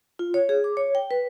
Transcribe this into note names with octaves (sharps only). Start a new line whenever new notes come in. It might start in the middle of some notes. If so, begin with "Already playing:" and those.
F4
C#5
G#4
D6
C#5
G5
B4